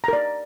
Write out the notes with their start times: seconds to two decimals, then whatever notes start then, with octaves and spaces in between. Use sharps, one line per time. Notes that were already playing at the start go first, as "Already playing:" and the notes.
0.04 A#5
0.08 A#4
0.13 D5